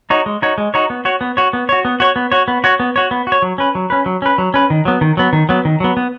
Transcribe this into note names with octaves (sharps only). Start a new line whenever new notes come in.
D#4 F#4 C#5
G#3
D#4 F#4 C#5
G#3
D#4 F#4 C#5
B3
F#4 C#5
B3
F#4 C#5
B3
F#4 C#5
B3
F#4 C#5
B3
F#4 C#5
B3
F#4 C#5
B3
F#4 C#5
B3
F#4
C#5
F#3
C#4 B4
F#3
C#4 B4
F#3
C#4 B4
F#3
C#4 B4
D#3
F#3 B3
D#3
F#3 B3
D#3
F#3 B3
D#3
F#3 B3
B3